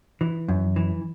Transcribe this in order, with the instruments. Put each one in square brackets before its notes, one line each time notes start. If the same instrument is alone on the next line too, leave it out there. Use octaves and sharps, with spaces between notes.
[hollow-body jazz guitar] E3
F#2
E3